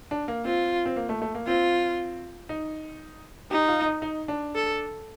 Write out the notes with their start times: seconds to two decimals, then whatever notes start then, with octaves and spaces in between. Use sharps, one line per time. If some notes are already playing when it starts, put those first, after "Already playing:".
0.11 D4
0.28 A#3
0.45 C4 F4
0.85 C4
0.96 A#3
1.09 A3
1.22 A3
1.35 A#3
1.47 C4 F4
2.49 D#4
3.51 D#4 G4
3.68 F4
3.86 D#4
4.02 D#4
4.28 D4
4.54 A4